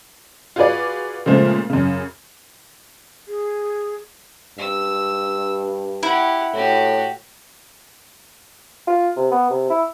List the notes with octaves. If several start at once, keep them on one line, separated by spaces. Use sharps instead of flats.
F4 F#4 G#4 B4 D5
A#2 C#3 F3 G#3 A3
F#2 C#3
G#4
G2 E6
E4 G4 F#5
A2 F#4 G4
F4
C3
B3
C3
E4